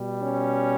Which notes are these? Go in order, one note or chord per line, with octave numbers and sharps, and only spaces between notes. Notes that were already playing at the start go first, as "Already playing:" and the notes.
Already playing: B2 G3
C#4